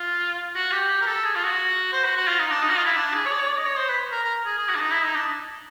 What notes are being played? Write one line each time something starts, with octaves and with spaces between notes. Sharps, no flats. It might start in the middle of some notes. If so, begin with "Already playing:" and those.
Already playing: F4
F#4
G4
G4
A#4
A4
G#4
F4
F#4
C5
F#4
F#4
F4
D#4
D4
D#4
F#4
F4
E4
D4
G#4
C#5
D5
C#5
D5
D#5
C#5
C5
B4
A#4
A#4
G#4
G#4
F#4
D4
D#4
E4
D#4
D4